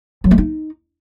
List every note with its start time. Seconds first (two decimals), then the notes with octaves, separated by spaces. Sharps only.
0.24 F#3
0.31 A3
0.38 D#4